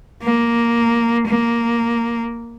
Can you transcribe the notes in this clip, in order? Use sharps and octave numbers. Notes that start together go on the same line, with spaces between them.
A#3
A#3